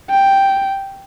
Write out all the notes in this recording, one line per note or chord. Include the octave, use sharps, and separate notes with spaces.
G5